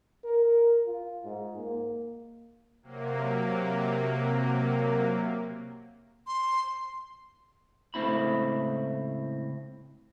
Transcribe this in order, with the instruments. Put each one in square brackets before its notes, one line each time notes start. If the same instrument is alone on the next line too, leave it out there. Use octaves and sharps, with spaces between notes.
[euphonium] A#4
F4
G#2
A#3
[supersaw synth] C3 F#3 A#3
[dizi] C6
[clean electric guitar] C#2 A2 A3 C4 E4 B5